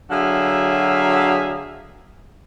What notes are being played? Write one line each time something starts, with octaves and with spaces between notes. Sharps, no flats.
D3 F#3 F#4 G#4 E5 F5